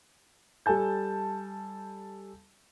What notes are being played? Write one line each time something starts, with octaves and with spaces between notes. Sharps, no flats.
G3 A4 G#5 A5 G6